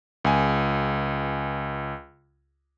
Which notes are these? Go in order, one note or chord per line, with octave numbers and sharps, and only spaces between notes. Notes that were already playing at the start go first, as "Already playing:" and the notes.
C#2 G#5